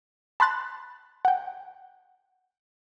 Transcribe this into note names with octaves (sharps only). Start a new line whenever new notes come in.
A5 B5 C6 F#6 A6
F#5 G5